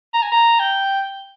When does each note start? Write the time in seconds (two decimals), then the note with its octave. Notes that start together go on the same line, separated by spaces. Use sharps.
0.13 A#5
0.22 G#5
0.32 A#5
0.59 G5